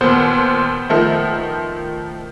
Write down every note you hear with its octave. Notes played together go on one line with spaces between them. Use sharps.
D#2 A#2 B3 C5
D#3 F3 A3